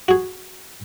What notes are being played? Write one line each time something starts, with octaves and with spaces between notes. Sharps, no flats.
F#4 G#4